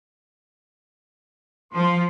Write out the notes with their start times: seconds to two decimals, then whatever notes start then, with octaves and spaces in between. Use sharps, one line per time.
1.73 F3 C6